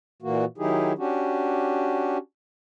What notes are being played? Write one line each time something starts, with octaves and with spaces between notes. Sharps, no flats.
A#2 E3 A#3 F#4
D#3 F#3 D#4 E4 G4 G#4
C#4 D4 F#4 G4